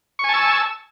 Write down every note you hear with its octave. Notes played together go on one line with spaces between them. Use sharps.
G#5 A5 C#6 E6